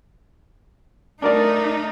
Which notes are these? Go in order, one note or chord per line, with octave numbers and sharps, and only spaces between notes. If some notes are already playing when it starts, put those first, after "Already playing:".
A3 D4 D#4 A#4 D5